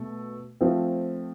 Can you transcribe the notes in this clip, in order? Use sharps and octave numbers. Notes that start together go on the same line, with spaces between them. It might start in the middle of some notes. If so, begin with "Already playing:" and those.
Already playing: B2 A3
F3 A3 C4